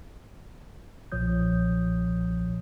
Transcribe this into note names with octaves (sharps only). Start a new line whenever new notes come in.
B1 A#2 F3 C#5 D#6 G6